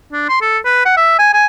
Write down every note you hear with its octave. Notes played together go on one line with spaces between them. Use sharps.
D4
C6
A4
B4
F#5
E5
G#5
G#5